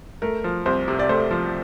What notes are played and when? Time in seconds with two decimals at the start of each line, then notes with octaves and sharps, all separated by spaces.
0.22 A3 A#4
0.44 F3
0.66 C2 C5
0.88 C3
0.99 D5
1.09 A3 C5
1.31 F3